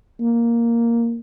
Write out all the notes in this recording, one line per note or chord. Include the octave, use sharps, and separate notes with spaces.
A#3